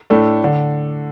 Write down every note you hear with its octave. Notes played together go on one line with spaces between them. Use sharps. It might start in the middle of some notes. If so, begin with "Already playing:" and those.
A2 A3 D4
D3